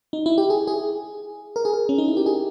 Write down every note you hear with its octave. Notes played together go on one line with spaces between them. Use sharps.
D#4
E4
G4
G#4
G#4
A#4
G#4
A#4
C#4
D#4
E4
G4
G#4